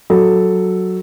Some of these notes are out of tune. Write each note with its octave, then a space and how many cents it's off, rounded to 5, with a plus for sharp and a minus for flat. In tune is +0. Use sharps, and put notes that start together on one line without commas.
F#3 +0 A4 +0